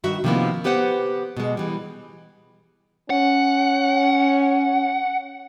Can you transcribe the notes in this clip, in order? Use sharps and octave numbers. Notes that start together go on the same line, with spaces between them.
G2 D#3 F#4 E5
C3 D#3 F3 A#3 B3 E4
B3 G4 B4 C5 F#5
B2 G#3
E3 G3
C#4 F#5